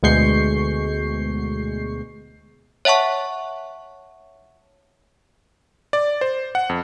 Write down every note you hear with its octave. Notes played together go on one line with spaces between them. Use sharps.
D2 B2 G#3 C#6 G6 C7
C#5 E5 F#5 A5 C#6
D5
C5
F#5
F2